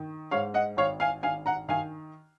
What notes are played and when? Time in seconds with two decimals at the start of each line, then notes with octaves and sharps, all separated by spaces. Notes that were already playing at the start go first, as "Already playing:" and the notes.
Already playing: D#3
0.31 G#2 C#5 F5
0.54 D#5 F#5
0.77 G#1 C#5 F5
1.00 F5 G#5
1.23 G#1 F5 G#5
1.46 F#5 A#5
1.69 D#3 F5 G#5